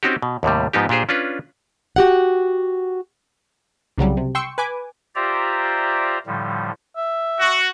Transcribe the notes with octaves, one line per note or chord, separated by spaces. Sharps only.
C4 C#4 D#4 F#4 G4
B2
D#2 A2 C3 G3
G#2 F3 B3 D#4 G4
A#2 D4 G4 G#4 C5
C#4 D4 F4 B4
F#4 G4 F#5
C2 C#3 F#3 G3
C3
G5 C6 C#6 E6 C#7
B4 G#5 D6
F4 G4 C5 D5 E5 A#5
A2 D3 F3 G3
E5
F#4